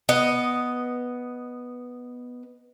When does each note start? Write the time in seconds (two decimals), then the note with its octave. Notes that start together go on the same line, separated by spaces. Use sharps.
0.09 B3 D#5